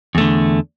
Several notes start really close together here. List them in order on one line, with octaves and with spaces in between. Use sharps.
E2 A3 D3